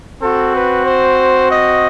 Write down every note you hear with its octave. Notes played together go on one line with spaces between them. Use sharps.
C4 F#4 A4
B4
C5
D#5